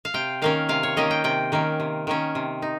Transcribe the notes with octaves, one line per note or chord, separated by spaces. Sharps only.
F5
C3 G5
D#3 A#3 C#4 F5
C3 F5
C#5
D#3 A#3 C#4 D#5
G5
C3 G5
D#3 A#3 C#4
C3
D#3 A#3 C#4
C3
D#4